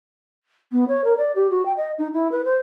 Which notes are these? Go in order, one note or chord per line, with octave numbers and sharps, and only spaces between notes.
B3
C#5
A#4
D5
G4
F#4
G5
D#5
D#4
E4
B4
C5